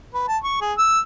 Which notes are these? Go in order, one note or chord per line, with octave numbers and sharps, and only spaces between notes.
B4
A5
C#6
G#4
E6